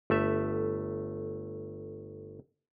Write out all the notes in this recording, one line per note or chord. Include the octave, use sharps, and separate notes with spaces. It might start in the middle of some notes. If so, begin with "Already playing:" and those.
G1 A3 E5